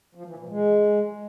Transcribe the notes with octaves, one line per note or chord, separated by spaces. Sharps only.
F3
E3
A#2
G#3